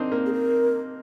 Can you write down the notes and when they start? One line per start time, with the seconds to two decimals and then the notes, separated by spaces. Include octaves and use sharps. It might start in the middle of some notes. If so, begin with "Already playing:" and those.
Already playing: A#3 C4 D4 D#4
0.12 A#3
0.26 G#4
0.33 A#4